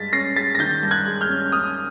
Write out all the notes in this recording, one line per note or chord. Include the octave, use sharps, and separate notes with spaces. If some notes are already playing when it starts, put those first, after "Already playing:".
Already playing: G2 G#3 A6 B6
C#4 A#6 C7
G#3 A6 B6
A#6
D#3 G6 A6
G2
F#6 G#6
G#3
F6 G6
C#4
C#4 D#6 F6